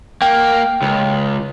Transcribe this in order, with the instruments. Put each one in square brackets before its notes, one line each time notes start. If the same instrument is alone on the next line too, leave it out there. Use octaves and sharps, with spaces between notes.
[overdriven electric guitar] A#3 [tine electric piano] G5
[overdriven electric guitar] C#2